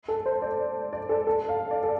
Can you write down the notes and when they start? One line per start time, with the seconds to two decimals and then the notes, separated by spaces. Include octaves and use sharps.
0.08 A4
0.26 C5
0.42 D5
0.93 D5
1.09 A4
1.27 A4
1.49 F5
1.71 D5
1.83 A4